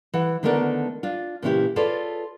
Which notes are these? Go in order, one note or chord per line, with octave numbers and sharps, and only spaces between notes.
E3 F#5
D3 D#3 A3 B3 A#4 D5
D4 F4
A#2 C#3 E3 C#4 E4 G4
F4 G#4 A4 B4 C#5 D5